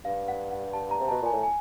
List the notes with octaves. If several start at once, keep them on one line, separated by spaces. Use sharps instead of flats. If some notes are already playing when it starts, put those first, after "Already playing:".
G2 F5
F#5
F#5
A5
A#5
C3
B2 A5
A#2 G#5
A2
G#5